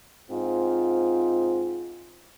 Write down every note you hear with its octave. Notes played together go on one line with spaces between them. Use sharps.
G#2 C4 F4